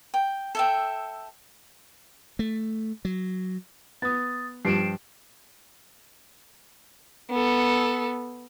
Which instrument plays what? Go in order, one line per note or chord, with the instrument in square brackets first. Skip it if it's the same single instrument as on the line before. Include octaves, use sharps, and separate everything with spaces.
[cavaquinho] G5
A4 E5 G5
[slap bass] A3
F#3
[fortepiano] B3 [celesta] D#6 A6
[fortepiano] G2 F3 G4 [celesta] C7 D7 E7
[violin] B3 A4